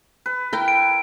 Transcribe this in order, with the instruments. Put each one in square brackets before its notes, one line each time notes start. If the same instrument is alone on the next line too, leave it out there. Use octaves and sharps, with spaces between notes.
[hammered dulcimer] B4
[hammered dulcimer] E4 [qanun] A#4 G5
[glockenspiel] D7